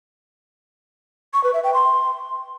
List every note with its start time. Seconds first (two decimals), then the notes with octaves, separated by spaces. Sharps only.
1.34 C#6
1.44 B4
1.54 E5
1.64 G5
1.74 C6